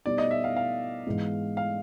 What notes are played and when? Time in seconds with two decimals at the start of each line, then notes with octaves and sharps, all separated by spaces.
0.06 B2 G3 B3 D#4 D5
0.18 D#5
0.31 E5
0.44 F5
0.57 F5
1.06 G#2 E3 G#3 B3
1.57 F5